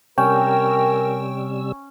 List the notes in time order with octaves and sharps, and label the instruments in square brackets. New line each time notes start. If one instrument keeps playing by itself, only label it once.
[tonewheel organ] C3 G3 E6 [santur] C#4 [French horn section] A#4 [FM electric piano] G5